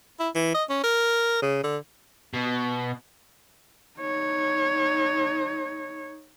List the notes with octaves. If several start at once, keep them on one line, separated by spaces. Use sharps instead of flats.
E4
E3
D#5
C#4
A#4
C#3
D3
B2
D#4 C#5